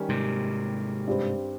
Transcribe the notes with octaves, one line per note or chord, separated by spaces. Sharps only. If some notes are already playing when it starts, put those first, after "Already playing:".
Already playing: D#3 G3 C#4
G#2 C3
G2 G3 C4